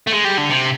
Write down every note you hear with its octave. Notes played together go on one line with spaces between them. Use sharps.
A3
G#3
G3
D3
C3